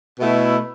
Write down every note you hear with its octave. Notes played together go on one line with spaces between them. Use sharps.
B2 A3 E4